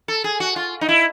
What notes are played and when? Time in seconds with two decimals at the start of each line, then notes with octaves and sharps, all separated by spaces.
0.08 A4
0.24 G#4
0.40 F#4
0.56 F4
0.81 D#4
0.89 E4